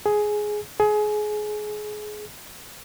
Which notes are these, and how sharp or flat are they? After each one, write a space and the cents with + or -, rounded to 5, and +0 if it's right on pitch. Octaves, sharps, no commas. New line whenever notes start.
G#4 +10
G#4 +25